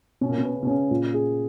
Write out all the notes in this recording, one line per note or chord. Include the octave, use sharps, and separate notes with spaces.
B2 C#4
A#2
B2
B4
C#3
B2
C#3 C#4
A#2
G#4